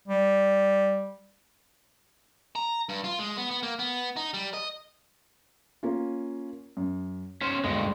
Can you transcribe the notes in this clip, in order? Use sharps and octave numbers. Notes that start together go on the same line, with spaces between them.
G3
A#5
G2
F4
G#3
B3
B3
A#3
B3
D#4
G3
D#5
A#3 C#4 F4
F#2
C#4 C5 C6
D2 G2 G#3